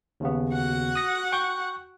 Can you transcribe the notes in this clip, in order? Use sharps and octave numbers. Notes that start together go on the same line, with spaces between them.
D#2 C#3 B3
F#4 F#5
D#6 A#6
G5 C#6 G6